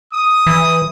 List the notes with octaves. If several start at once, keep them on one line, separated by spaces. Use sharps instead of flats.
D#6
E3